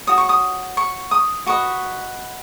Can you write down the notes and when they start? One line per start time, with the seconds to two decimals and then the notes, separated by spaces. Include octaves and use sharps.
0.07 F#4 C#5 D#6
0.18 C#6
0.29 D#6
0.77 C#6
1.11 D#6
1.46 F#4 B4 D#5 C#6